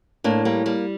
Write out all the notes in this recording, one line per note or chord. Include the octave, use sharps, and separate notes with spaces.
A2 A#3 D4
G3 A#3
G3 A#3